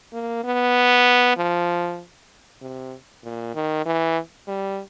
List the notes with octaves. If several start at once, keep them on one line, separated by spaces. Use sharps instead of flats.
A#3
B3
F3
C3
A#2
D#3
E3
G3